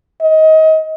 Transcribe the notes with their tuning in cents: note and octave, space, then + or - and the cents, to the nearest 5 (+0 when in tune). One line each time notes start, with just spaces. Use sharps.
D#5 +25